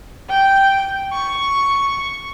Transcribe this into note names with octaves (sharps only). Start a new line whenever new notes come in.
G5
C#6